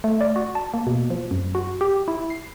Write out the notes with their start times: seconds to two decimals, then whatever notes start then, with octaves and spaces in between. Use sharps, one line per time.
0.04 A3
0.21 D5
0.36 F#4
0.55 A5
0.74 A#3
0.87 B2
1.10 F3
1.31 F#2
1.55 F#4
1.81 G4
2.08 E4
2.30 C7